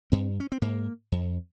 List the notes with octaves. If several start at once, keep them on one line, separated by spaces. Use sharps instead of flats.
G2 C4
C#4
C4
G#2 A#3
F2